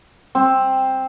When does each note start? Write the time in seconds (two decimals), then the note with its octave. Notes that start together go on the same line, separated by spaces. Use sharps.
0.35 C4